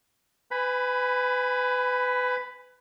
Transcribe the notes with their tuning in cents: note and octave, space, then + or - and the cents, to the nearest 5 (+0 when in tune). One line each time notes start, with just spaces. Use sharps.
B4 +25 G#5 -15 B5 +0